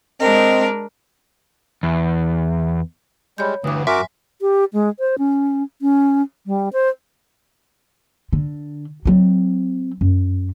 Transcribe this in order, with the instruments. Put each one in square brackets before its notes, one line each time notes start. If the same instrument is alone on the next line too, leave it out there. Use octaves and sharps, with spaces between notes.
[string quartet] G#3 D4 A#4 [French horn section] C4 D#5
[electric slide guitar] E2
[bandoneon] G3 G#3 [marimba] C#5 B5 G6
[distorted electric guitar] D2 [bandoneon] G2 E3 [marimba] D6 D#6
[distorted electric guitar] F#2 [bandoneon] F#4 A#4 D6 [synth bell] E5 C6 B6 [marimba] G#5
[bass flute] G4
G#3
C5
C#4
C#4
G3
C5
[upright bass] D3
F#3 C4
F#2